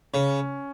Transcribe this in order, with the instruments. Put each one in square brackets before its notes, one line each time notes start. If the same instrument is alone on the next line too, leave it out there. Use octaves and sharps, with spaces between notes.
[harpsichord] C#3 [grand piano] C#4